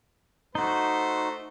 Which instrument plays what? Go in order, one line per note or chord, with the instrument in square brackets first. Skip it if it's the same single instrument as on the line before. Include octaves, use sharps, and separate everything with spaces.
[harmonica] A3 C5 [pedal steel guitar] D#4 F#4